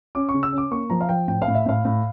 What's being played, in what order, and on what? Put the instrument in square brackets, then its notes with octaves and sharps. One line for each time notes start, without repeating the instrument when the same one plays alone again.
[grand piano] C#4 D6
C#6
C#3
E6
C#4
D6
A#3 C#6
F3 A#5
F5
F3 G5
A2 G5
F5
A2
E5
A2 F5
A2